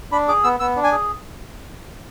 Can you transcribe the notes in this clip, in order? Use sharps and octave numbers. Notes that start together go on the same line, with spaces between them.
D4 B5
G#4 D6
B3 E6
B3 E6
D4
G#5
G#4